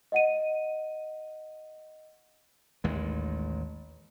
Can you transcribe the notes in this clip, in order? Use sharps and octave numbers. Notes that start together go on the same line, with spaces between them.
D#5 F#5 D#7
A1 D#2 A2 G#3